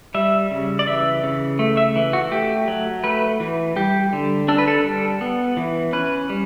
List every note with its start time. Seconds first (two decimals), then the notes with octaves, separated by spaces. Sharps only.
0.14 G3 E5
0.51 C#3
0.79 D5
0.87 E3 E5
1.23 C#3
1.59 A3
1.77 E5
1.96 E3
2.13 F#4
2.31 A3 G4
2.68 F#3
3.04 A3 B4
3.40 E3
3.76 G3 G4
4.13 D3
4.48 D4 A4
4.58 B4
4.68 A4
4.84 G3
5.21 B3
5.57 E3
5.93 C#4 B4
6.30 G3